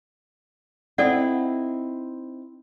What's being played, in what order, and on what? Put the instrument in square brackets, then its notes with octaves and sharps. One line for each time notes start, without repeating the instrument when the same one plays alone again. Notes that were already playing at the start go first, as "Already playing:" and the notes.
[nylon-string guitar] C4 D#4 E4 [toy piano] A4 D5 F#5